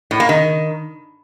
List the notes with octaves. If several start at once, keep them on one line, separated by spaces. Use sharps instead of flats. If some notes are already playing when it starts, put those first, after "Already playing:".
A2
A#3
D#3